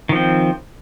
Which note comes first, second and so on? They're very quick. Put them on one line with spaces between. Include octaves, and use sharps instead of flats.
D#3 F3 C4